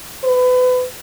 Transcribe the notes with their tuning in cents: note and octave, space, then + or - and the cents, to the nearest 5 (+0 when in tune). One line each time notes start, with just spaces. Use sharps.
B4 +30